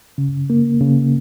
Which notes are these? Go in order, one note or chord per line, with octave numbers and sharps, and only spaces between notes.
C#3
A#3
C#3